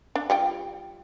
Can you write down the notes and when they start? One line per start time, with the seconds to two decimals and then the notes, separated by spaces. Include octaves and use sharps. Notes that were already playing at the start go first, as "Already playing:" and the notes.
0.15 D4
0.30 G3 F4 G5